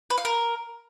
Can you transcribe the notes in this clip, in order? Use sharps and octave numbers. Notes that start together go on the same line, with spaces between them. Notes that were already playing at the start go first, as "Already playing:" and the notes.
B4
F5
A#4